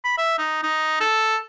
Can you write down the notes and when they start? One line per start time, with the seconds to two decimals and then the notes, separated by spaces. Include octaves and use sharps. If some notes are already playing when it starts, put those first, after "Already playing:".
0.05 B5
0.18 E5
0.38 D#4
0.63 D#4
1.00 A4